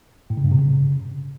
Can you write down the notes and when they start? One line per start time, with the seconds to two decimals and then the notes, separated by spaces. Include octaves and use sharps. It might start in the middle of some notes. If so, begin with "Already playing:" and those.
0.30 A2
0.37 C#3
0.44 G2
0.52 C3
0.59 C#3